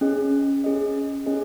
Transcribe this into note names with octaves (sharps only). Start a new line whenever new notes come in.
C#4 G#4 D#5
C#4 G#4 D#5
C#4 G#4 D#5